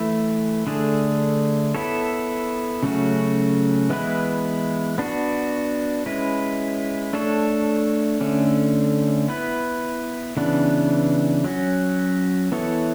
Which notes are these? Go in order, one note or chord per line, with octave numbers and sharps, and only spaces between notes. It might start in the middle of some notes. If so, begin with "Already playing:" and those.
Already playing: E3 A3 E4
D3 A3 D4 G#4
B3 E4 A4 C#5
C#3 F#3 A3 C#4 F#4
E3 G#3 B3 E4 B4
B3 D4 F#4
G#3 C#4 E4 B4
A3 D4 A4 C#5
D3 A3 C#4
B3 E4 B4
C#3 E3 B3 D4
F#3 C#4 F#4
E3 B3 E4 A4 C#5